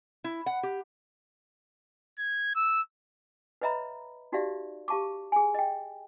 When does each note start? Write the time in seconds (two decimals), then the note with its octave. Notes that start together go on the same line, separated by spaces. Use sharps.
0.24 E4
0.46 F#5
0.63 G4
2.19 G#6
2.55 E6
3.61 B4 C#5 D#5 E5 A#5 B5
4.32 D#4 F#4 G4 D5 E5 F5
4.88 G4 F5 A5 C#6 D6
5.32 G#4 G#5
5.54 D#5 G5